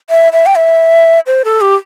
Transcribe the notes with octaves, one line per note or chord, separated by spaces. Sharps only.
E5
E5
G5
E5
C5
A4
G4